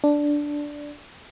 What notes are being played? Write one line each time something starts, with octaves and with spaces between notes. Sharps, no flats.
D4